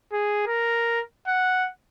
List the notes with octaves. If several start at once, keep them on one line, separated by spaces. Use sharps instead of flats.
G#4
A#4
F#5